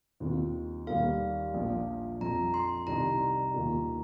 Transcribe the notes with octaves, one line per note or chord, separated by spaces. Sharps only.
D#2 D#3 C4 F4
D#2 D#3 G3 A#3 F5
A#1 A#2 F3
F2 F3 C4 A#5
C6
C2 C3 D#3 G3 D#4 A#5
D#2 D#3 A#3 F4